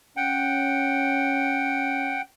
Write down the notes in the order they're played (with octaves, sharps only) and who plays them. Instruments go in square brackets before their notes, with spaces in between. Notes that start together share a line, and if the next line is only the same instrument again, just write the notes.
[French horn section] C#4 [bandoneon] F#5 G5